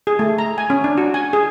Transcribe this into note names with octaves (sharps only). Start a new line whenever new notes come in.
G#4
A3
A#5
G#5
C#4
D4
F#4
G#5
G#4